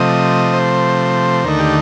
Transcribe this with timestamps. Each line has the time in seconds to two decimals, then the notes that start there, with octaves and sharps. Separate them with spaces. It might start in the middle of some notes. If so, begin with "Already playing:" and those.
Already playing: C3 F3 A3 D#5
0.53 C5
1.44 D#2 D3 A3 D#4 A#4
1.60 G4